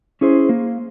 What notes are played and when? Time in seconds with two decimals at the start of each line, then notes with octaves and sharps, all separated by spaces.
0.21 C#4 E4 G#4 C5
0.49 A#3